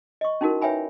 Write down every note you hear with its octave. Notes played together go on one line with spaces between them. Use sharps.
D#5 C#6
C#4 D#4 E4 F#4 A#4
B4 C#5 E5 G5 G#5 B5